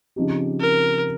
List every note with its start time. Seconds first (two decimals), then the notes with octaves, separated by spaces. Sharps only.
0.16 C#3 F3 C4 D#4 G4
0.60 A#4